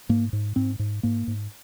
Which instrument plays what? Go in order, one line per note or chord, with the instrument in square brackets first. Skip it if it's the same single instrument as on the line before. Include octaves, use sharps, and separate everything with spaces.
[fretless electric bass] G#2 A#3
G#2
G#2 C4
G#2
G#2 A#3
G#2